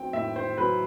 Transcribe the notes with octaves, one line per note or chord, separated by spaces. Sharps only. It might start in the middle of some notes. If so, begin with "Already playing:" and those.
Already playing: F#3 C4 G5
A2 E5
C5
F#3 B4